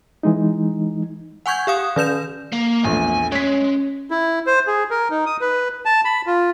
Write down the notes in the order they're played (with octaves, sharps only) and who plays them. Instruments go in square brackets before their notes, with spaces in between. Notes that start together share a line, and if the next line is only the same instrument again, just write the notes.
[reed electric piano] E3 G#3 D#4
[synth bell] F#5 G#5 C#6 G6 G#6
G4 F5 D#6
D#3 B4 G6 E7
[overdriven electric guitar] A#3
[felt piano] A#1 E2 [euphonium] A3 [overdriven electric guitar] G#5
[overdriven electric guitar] G#3 [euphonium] C#4 [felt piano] C#5 B6
[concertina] E4
C5
G#4
A#4
D#4
D#6
B4
A5
B5
F4